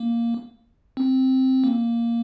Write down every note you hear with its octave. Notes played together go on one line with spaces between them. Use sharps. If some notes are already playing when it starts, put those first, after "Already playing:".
Already playing: A#3
C4
A#3